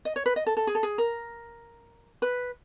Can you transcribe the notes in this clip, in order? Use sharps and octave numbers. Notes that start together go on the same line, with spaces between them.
D#5
C#5
B4
D#5
A4
A4
G#4
A4
G#4
A#4
B4